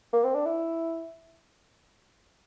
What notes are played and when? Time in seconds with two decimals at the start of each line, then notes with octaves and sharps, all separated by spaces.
0.13 A#3
0.24 C4
0.34 D4
0.46 E4